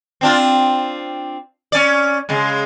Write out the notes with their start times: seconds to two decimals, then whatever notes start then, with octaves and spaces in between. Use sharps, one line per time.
0.21 C4 D4 F4
1.72 C#4 D5
2.29 C#3 G#3